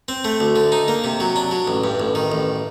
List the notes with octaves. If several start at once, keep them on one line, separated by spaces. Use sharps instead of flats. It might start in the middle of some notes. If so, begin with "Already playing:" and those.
C4
A3
D2
D3
D#4
A#3
C3
F#3
D4
F#3
A1
G2
A1
D#3
A1